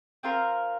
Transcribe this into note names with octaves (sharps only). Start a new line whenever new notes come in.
C4 F4 A#4